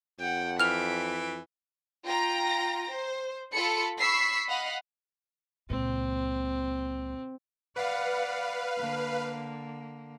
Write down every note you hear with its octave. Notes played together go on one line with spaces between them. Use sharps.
F2 F#5 G5
E3 F6 B6 D7 F7
F4 G5 A#5 A#6
C5
F4 A4 B5 C#7
B5 C#6 E6 B6 C7
D#5 F5 F#5 B5
C#2 A#2 C4
B4 D5 F5 F#5
D3 A#3